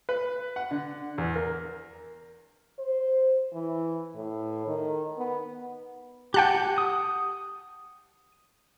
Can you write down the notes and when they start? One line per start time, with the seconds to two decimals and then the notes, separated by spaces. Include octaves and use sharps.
0.09 B4
0.56 F#5
0.71 D3
1.18 E2
1.35 A#4
2.79 C5
3.53 E3
4.15 A2
4.67 D#3
5.18 B3
6.34 G4 F#5 G5 A5 F#6
6.78 D#6